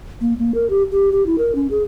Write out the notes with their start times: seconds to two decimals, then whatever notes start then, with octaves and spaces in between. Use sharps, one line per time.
0.21 A#3
0.39 A#3
0.54 A#4
0.70 G4
0.92 G4
1.12 G4
1.26 E4
1.38 A#4
1.55 C#4
1.71 G#4